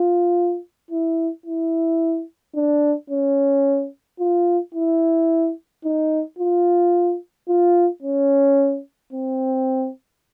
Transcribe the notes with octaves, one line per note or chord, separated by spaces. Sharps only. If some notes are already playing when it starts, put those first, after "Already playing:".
Already playing: F4
E4
E4
D4
C#4
F4
E4
D#4
F4
F4
C#4
C4